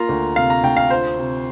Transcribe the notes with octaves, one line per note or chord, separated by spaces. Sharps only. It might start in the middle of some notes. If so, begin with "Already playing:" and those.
Already playing: A#3 F4 A#5
D2
C3 F5
A#5
D2 G5
F5
F4 C5
C3